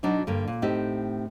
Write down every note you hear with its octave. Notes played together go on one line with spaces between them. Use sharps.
B2 F#3 D4 D#4 F#4
G2 D3 A#3
A#2
A2 C4 D#4 G4 E5